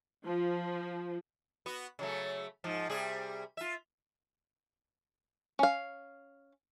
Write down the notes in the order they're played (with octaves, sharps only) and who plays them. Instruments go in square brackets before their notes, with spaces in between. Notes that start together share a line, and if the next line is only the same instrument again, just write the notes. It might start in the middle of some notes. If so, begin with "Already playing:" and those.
[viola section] F3
[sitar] B3 F#4
C#3 F#3 A3
G#2 F3
C3 G3 G#4
F4 E5
[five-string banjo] C#4 F5